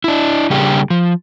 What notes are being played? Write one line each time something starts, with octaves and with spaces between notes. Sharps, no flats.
D4 E4
C#3 G3 A#3 D4 G4 G#4
F3